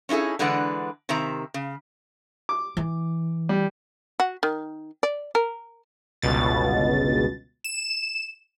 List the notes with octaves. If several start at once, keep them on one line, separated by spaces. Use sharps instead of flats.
C#4 D#4 E4 G#4 A4
D3 E3 G#3 D4 B4 F#5
C3 D#3 C4 E5 A#5
C#3
D6
E3
G3
F#4
D#3
D5
A#4
G1 C#2 B2 A6
E7